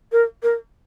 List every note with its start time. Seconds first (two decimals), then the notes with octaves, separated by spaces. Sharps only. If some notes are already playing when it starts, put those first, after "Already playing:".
0.12 A#4
0.43 A#4